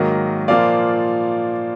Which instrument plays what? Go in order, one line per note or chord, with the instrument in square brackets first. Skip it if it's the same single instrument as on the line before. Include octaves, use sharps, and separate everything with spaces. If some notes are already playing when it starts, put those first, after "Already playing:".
Already playing: [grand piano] G#2 D#3 F#3 A#3 D#5
A#2 F3 A#3 D5 F5